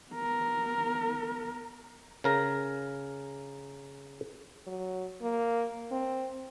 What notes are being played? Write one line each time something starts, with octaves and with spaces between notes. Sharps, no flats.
B3 A#4
C#3 A#4 A#5
F#3
A#3
C4